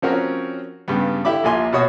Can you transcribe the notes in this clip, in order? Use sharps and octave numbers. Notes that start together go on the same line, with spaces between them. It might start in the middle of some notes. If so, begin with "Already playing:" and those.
F3 C4 C#4 F#4 A#4 C#5
G2 C#3 G3 B3
D3 E4 G4 E5 B5 D6
A#1 A#2 G#5 C6
B2 F#4 C#5 D#6